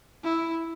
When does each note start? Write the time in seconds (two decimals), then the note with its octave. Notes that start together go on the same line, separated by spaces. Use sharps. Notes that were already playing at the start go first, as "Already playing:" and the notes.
0.24 E4